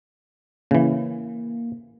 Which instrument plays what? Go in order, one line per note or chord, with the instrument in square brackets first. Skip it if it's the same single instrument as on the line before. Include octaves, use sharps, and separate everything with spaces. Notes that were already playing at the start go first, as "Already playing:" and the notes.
[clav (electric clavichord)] C#3 E3 [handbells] A#3